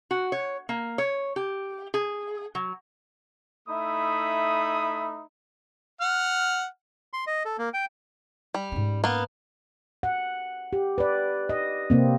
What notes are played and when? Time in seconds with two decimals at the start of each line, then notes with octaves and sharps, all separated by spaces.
0.11 F#4
0.32 C#5
0.69 A#3
0.98 C#5
1.36 G4
1.94 G#4
2.55 F#3
3.69 A3 D#4 E4 E5 B5 D#6
6.01 F#5 F6
7.13 C6
7.27 D#5
7.45 A4
7.59 A#3
7.74 G5
8.54 G3
8.72 G#2 C#4
9.04 A#3 B3
10.03 F#5
10.73 G4
10.98 B4 D5
11.49 D#5
11.90 C3 A#3 C4